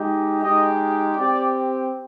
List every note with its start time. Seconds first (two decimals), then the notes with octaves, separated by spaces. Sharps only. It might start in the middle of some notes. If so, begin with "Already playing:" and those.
Already playing: G#3 D#4 G4
0.42 G#3 D#4 G4 D#5
1.17 C4 G4 D5